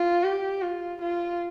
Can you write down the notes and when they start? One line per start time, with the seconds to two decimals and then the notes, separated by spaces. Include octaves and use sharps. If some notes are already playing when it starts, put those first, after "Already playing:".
Already playing: F4
0.24 G4
0.62 F4
1.01 F4